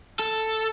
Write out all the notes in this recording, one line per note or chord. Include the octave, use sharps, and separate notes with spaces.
A4